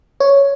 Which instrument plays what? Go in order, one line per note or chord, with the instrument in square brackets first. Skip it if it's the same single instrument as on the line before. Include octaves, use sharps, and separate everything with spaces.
[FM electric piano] C#5